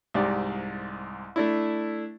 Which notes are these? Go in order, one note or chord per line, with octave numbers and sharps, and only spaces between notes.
C2 G#2 G4 D5
A3 D4 E4